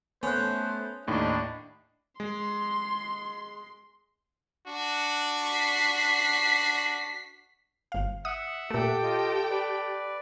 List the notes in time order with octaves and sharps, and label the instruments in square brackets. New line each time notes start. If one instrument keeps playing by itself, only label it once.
[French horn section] A3 [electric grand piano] B3 F#6 [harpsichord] C#4 [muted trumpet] C5
[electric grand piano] D#2 A2 [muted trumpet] D4 [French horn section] D#4
[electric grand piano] G#3 [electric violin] C6
[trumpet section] D4 F#4
[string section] B6 C7
[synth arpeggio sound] G1 F5
[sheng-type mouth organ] E5 F#5 [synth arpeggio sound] D#6
[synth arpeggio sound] A#2 A3 [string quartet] G4 A4 G5
[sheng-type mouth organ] F4 D#5
B4 D5